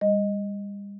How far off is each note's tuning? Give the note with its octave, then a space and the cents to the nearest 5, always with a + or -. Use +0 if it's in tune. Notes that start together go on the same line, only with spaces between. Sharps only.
G3 +40 D#5 +0